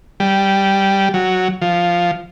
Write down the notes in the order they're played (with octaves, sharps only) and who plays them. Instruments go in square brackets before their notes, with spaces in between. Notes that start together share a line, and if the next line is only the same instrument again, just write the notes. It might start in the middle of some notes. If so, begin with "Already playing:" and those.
[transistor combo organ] G3
F#3
F3